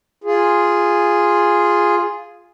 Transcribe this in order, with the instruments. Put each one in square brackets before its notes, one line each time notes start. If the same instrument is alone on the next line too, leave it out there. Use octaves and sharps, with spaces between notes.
[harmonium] F4 G#4